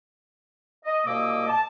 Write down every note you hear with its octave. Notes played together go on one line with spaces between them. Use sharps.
D#5
C2 B2 A#3 D#5 D6 E6
A5